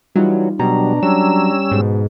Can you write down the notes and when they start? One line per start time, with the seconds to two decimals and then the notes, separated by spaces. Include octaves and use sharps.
0.16 E3 F#3 G3 D#4 F4
0.59 B2 F#3 G3 D4 A#5
1.03 F#3 G3 C#4 E6
1.72 G#2 B2